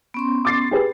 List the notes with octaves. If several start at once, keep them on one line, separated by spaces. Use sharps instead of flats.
B3 C#4 C6
D6 A6 C7
G4 G#4 B4